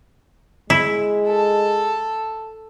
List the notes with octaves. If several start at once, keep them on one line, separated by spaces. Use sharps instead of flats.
G#3 E4
A4